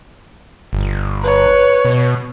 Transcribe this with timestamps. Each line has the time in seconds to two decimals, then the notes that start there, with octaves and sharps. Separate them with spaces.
0.73 G1
1.23 B4 C#5
1.85 B2